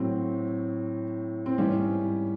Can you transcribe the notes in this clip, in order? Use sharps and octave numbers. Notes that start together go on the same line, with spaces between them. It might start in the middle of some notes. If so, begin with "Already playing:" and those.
Already playing: A2 F#3 C4
C4
G#2 E3 G3 C#4